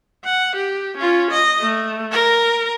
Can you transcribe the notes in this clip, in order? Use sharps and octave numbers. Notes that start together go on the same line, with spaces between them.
F#5
G4
C#4 F4
D#5
A3
A#4